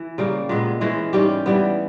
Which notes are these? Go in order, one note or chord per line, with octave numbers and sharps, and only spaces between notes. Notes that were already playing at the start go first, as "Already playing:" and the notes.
Already playing: E3
C#3 G3 A#3
A#2 G#3 B3
E3 G#3 C#4
G#2 G3 C#4 G4
E3 G3 B3